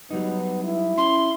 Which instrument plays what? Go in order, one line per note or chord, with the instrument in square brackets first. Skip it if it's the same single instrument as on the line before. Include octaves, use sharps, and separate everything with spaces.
[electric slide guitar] F#3 G3 D#4 [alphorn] B3
[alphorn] E4
[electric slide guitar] C#4 [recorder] C6